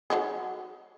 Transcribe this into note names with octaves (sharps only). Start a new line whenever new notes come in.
F#3 D#4 G#4